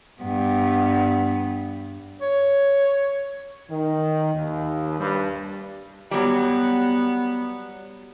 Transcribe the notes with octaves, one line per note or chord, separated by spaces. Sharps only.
G2 B3
C#5
D#3
D#2
G2
F#3 G3 B3